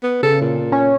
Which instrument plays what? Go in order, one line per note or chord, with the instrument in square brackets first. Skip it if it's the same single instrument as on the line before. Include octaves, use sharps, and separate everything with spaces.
[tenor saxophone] B3
[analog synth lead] C#3 [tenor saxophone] A4
[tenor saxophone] A#2
[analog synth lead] C#4